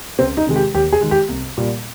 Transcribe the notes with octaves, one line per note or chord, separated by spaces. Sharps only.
C#2 C4
D#4
C3 D#3 G#3
G4
D#2 G4
G#4
D#3 G#3
G4
C2
A#2 G3